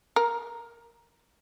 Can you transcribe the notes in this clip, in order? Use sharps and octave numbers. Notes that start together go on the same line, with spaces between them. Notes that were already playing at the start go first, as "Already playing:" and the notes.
A#4